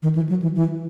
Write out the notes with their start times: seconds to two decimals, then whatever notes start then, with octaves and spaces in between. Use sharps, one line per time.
0.03 D#3
0.15 E3
0.29 F#3
0.42 E3
0.55 E3